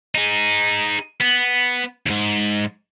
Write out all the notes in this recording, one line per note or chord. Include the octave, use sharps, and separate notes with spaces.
D#4 G#4
B3
D#2 G#2